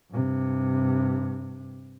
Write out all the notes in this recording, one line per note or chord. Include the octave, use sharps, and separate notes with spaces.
G2 C3